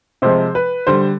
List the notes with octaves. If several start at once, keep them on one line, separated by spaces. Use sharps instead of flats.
C3 F3 G#3 C5
B4
D3 G3 C5